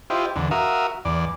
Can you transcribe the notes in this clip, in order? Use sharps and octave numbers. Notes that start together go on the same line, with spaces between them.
E4 F4 G4 C5 D#5
E2 D3
F#4 A#4 E5 F5 D#6
E2 D5